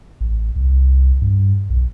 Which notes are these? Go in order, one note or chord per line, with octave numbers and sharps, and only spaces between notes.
A1
C2
G2
B1